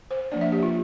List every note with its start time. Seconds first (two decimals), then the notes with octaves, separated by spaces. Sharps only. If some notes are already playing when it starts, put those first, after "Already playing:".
0.11 C5
0.32 F3 A#3 D4 D5
0.41 E5
0.52 G4
0.63 F4